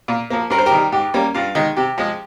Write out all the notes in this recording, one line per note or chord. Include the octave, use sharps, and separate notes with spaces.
A#2
F3 A#3
G2 A#4
C5
G4 A#4
D#3 G3
G#2 G4
G3 A#3 C#4
G2 F4
D#3 G#3
C3 G4
F3 G#3